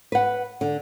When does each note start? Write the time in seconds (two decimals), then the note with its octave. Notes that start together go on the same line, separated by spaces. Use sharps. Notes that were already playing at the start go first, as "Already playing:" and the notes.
0.12 B4 F#5
0.61 D3